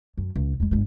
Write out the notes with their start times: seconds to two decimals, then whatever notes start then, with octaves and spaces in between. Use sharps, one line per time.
0.18 F#2
0.36 C#2
0.60 E2 G#3
0.71 G1 G#3